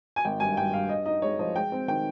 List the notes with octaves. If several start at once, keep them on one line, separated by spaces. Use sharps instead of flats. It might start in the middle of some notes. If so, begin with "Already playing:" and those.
G#5
G#1 G5
G2 G#5
G2 G5
G2 F5
G2 D#5
D#4 D#5
G#3 C#5
F3 D#5
G#3 G5
C4
D#3 G5